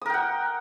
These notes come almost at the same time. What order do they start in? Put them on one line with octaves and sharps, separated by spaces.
D#6 A#4 G5 F#5